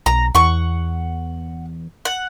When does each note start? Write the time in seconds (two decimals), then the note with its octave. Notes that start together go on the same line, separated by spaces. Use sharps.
0.06 B1 A#5
0.35 E2 F#5 C#6
2.05 F#5